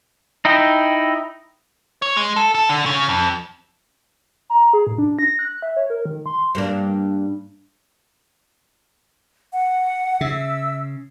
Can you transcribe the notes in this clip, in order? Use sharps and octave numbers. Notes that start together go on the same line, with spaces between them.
D#4 E4 G5
C#5
G#3
A4
A4
D3
C#3
F2
A#5
G#4
A2
D4
A#6
F#6
E5
C#5
A#4
D#3
C6
G2 A#3 D4
F#5
C#3 E5 E6